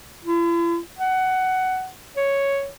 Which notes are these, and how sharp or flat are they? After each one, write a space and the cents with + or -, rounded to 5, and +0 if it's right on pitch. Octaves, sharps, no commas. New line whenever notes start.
E4 +45
F#5 +15
C#5 +0